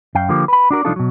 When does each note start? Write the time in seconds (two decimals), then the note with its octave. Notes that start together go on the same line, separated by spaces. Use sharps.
0.15 F#2 F#3 F5 G5
0.29 D3 F3 A#3 G4
0.48 B4 B5
0.71 D4 F#4 A#4 D5
0.85 C2 F3 D4 D#4 F4 A4
0.96 B2 F#3